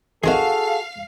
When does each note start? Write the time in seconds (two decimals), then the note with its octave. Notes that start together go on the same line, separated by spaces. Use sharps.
0.24 D#3 C4 F#4 G#4 A4 E5 F5